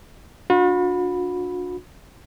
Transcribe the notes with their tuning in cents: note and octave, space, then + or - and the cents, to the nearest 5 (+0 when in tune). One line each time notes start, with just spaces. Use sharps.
D4 +0 F#4 -45 B5 +0